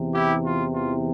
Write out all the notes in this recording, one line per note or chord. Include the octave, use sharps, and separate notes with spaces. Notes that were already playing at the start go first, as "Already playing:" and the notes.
Already playing: E2 C3 E3
E4 G4
F4
F4